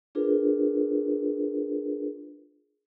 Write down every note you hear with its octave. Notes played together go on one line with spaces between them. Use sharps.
D4 F4 G#4 A#4 B4